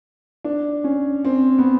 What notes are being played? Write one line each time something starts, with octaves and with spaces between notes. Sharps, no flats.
D4
C#4
C4
B3